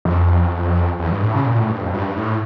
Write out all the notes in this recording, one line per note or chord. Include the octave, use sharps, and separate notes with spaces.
F2
E2
G2
A2
C#3
A#2
A2
G2
F2
G2
A2